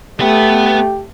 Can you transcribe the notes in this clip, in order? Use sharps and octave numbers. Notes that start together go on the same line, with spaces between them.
A3 B3 G4 B4